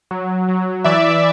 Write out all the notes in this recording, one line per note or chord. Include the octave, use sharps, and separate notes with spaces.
F#3
F#3
E3 D5 E5